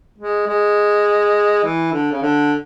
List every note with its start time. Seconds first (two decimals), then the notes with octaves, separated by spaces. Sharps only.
0.19 G#3
0.47 G#3
1.64 E3
1.93 D3
2.12 C#3
2.22 D3